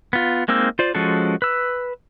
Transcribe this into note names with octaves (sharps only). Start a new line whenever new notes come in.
B3 F4
G#3 A#3 C4 D#4 E6
F4 C5 D5
F3 G#3 C#4 F#4 A4
B4 E6